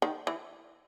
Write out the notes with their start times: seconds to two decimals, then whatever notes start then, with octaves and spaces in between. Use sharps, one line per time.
0.02 D#3
0.27 E3